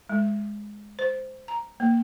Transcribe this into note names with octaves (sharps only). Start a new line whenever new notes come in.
G#3
C5
A#5
A#3